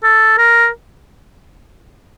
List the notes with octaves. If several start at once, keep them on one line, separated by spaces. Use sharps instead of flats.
A4
A#4